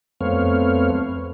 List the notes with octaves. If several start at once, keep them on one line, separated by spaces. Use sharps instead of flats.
F2 A3 B3 C4 C#5 F5